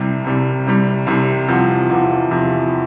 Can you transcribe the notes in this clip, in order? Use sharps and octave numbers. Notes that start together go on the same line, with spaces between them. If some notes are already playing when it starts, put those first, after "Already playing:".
Already playing: C2 C3 G3
C2 C3 G3
C2 C3 G3
C2 C3 G3
E2 C3 F3
E2 C3 F3
E2 C3 F3